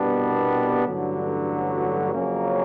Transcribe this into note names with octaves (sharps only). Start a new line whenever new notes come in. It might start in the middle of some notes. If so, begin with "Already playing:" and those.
Already playing: C2 B2 G3 B3 D4
A1 G2 D3 F#3
F2 C#3 F#3 A#3 C#4